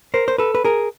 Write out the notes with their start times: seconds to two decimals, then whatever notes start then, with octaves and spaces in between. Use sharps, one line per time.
0.14 A#4 C5
0.28 C5
0.38 A4 B4
0.55 B4
0.65 G#4 A#4